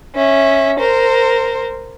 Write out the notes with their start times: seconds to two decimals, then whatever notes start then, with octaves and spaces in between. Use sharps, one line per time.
0.15 C#4 E5
0.80 A#4 C5